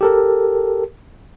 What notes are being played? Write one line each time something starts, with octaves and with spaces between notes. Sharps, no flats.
G4 A4 A#4